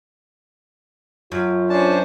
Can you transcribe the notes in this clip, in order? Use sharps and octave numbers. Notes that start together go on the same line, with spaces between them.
F#2 F4
C#4 D4 C5 A5